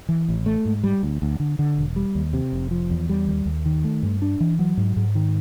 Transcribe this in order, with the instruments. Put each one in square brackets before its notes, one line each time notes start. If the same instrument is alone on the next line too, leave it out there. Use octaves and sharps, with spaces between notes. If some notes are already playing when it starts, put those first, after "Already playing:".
[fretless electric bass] E3
A1
A3
G#2
G3
D2
D2
D3
D3
E1
G3
D#2
C3
F1
F3
E2
G3
D#2
D#2
D#3
A3
G2
D4
E3
F#3
G#2
G#2
D#3